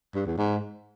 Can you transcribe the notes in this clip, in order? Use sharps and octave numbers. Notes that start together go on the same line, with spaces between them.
G2
E2
G#2